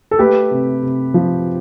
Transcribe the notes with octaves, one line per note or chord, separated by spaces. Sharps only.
A4
A3 G4 B4
C3
C3
F3